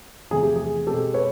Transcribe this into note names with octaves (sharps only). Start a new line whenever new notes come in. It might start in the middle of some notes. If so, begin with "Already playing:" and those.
E2 C3 F3 A3 G#4
G4
G#4
B2 G#3 C4 G4 A4
B4 C#5